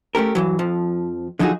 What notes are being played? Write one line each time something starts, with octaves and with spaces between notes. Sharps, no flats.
A3 C#4 G4 A#4
G2 E3 F#3
F2 F3
D3 F3 F#3 D#4 F#4 G#4